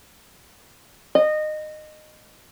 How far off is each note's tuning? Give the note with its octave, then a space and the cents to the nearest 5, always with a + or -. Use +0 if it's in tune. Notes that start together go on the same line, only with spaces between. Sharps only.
D#5 -20